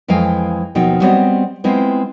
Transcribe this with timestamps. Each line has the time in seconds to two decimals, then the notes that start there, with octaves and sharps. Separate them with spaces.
0.08 F2 E3 G#3 F5 G5
0.75 D#2 B2 F3 D#4 G5
1.01 G3 B3 C4 F#4 C#5 D#5
1.64 G#3 B3 C4 E4 F4